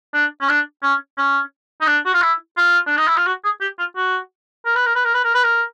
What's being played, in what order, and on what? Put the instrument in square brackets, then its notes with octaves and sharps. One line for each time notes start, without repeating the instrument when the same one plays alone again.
[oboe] D4
C#4
D4
C#4
C#4
D#4
D4
F#4
F4
E4
F4
D4
D#4
E4
F4
F#4
G#4
G4
F4
F#4
A#4
B4
A#4
B4
A#4
B4
A#4
B4
A#4